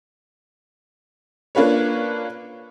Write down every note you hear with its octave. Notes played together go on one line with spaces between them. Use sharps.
A#3 D4 F4 B4 C#5